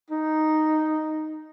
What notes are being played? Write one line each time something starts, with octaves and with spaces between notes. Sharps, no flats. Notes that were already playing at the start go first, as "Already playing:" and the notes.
D#4